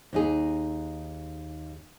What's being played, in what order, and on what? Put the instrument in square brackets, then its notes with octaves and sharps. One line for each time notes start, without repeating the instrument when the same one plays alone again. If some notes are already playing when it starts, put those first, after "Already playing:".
[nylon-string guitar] D#2 D#4 G#4